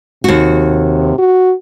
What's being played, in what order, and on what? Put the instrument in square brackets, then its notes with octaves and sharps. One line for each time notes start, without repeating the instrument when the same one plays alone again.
[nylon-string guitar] D#2 F#4 [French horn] C3
[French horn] F#4